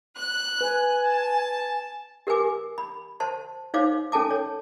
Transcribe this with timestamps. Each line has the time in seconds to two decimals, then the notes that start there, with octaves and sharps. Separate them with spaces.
0.17 F#6
0.61 B4 G#5
1.06 A5
2.27 G4 A#4 B4 G#5 D6
2.78 B5
3.20 C5 A5 C6
3.74 D#4 C5 C#5 F5 D6
4.12 C#4 A4 G#5 A5 D6
4.31 C#5